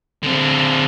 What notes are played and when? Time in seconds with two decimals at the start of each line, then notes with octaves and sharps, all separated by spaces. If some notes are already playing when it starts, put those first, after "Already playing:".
0.23 D3 C4